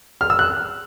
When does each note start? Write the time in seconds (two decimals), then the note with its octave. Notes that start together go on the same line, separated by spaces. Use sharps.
0.21 F6
0.30 E6
0.39 F#6